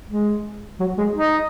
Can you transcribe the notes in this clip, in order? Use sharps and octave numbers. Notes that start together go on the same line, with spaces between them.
G#3
F#3
G#3
D#4